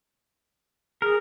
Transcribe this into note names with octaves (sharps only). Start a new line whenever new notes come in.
G#4 A#4